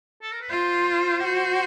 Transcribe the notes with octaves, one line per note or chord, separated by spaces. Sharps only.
A4
A#4
B4
F4 C5
F#4